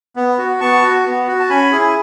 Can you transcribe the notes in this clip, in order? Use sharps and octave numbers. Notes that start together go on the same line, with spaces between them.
B3
F#4
B3 A5 C#6
F#4
B3
F#4
A5
C#4 G#5 B5
E4 G#4